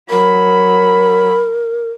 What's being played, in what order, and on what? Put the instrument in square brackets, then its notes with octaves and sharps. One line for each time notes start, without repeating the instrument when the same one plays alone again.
[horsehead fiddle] F#3 B5 [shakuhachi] A#4